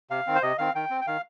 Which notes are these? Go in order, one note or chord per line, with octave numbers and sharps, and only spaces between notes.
C3 F5
D#3 C4
C5
C3 D#5
D#3 C4 F5
D#3 G5
C4
G5
D#3 F5